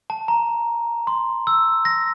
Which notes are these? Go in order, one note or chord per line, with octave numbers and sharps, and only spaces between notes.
A5
A#5
C6
E6
A#6